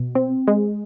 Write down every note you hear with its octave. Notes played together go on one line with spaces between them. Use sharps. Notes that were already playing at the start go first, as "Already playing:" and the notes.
Already playing: B2
C4
G#3